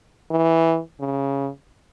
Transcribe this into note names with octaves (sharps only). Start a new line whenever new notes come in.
E3
C#3